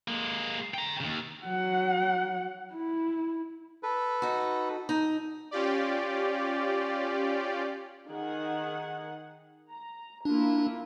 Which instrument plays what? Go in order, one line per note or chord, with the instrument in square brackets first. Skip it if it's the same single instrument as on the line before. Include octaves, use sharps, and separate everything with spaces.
[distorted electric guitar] G#3 A#3
G5 A#5
D#2 C#3
[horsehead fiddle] F#3 F#5
E4
[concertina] A4 B4
[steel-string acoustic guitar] D#4 F#4
D#4
[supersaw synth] C#4 F4 G4 D5
[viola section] D#3 G#4 F#5
A#5
[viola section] A#3 E4 F4 [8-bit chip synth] D4